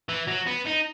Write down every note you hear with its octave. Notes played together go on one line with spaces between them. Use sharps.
E3
F#3
B3
D#4